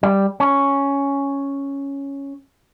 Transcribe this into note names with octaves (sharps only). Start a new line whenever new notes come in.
G3
C#4